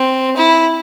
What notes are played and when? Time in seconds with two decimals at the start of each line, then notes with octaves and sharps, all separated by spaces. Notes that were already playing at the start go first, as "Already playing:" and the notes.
Already playing: C4
0.37 E4